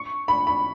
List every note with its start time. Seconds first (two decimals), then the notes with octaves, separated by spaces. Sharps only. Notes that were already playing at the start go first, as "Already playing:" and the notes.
Already playing: C#6
0.28 B5
0.47 B5